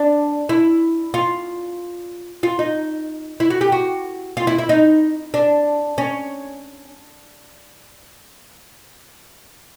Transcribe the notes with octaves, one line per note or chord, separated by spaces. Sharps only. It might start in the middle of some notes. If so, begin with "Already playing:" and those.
Already playing: D4
E4
F4
F4
D#4
E4
F#4
G4
F#4
F4
E4
E4
D#4
D4
C#4